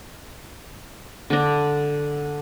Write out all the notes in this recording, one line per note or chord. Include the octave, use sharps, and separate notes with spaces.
D3 D4